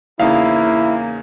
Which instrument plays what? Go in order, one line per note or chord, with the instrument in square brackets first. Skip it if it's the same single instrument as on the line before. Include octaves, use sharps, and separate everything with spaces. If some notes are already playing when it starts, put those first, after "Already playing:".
[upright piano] E2 C#3 D#4 [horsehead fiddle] A#3 [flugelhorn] E4 [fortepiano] F5